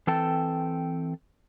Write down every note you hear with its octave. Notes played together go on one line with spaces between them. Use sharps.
E3 C4 A4 G5 A5